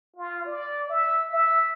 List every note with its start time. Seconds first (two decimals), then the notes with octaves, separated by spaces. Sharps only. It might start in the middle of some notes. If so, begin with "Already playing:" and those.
0.17 F4
0.46 D5
0.89 E5
1.32 E5